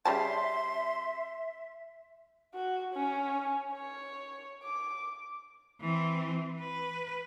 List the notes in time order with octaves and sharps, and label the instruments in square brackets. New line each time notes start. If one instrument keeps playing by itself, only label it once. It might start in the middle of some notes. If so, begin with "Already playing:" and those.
[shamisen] C#3 G3 A5 [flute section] E5 [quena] C6
[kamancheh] F#4
C#4
C#5
D6
[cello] E3 C4
B4